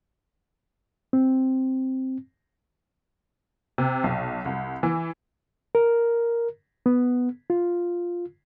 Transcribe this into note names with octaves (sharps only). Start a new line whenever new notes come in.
C4
C3
B1
C2
E3
A#4
B3
F4